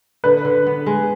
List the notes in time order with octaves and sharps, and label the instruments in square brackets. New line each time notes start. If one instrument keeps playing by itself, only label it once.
[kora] D3 [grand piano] B4
[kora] D3
B3
G#3